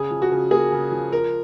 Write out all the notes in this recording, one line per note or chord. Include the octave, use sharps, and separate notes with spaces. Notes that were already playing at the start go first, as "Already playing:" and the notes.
Already playing: C#3 G#4
F3
F#4
C#3
A#3 G#4
C#3
F3
F3 A#4